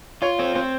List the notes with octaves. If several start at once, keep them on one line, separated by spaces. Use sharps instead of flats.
F4 C#5
C4 C#5
C4 C5